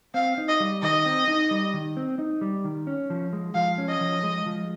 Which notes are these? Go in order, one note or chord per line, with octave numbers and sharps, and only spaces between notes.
C4 F5
D#4
D#5
G3
D#3 D#5
C4
D#4
G3
D#3
C4
D#4
G3
D#3
C#4
F3
G#3
F3 F5
C#4
D#5
F3
G#3
F3